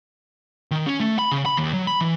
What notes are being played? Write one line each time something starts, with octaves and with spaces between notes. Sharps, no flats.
D#3
C#4
A3
B5
C#3
B5
D#2
F#3
B5
E3